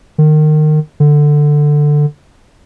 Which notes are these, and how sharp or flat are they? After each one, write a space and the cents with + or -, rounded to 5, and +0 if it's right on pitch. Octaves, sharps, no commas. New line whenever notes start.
D#3 -25
D3 +10